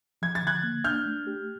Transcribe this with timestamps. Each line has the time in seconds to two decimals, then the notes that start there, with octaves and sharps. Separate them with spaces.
0.22 F3 G#6
0.35 A6
0.43 D3 F#6 G#6
0.63 A#3
0.84 D4 F6 G6
1.06 A3
1.27 G4